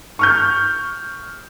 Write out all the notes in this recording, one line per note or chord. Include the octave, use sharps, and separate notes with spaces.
C#6 F6 G6